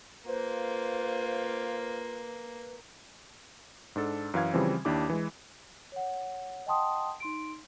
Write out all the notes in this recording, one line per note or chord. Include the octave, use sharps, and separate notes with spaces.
A#3 F4 B4 C5
G#2 D4 A4
F#2 E3 F5 G#6
C#3 E3 F3 G3 C4
D#2 D4 E4 G4 D6
E3 G#3
C#5 F#5
D#5 F#5 G5 A5 C6 D#6
D#4 C6 D7